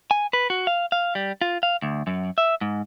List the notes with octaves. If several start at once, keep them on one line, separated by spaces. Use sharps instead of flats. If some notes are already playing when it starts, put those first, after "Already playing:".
G#5
B4
F#4
F5
F5
G3
F4
F5
D2
F#2
E5
G#2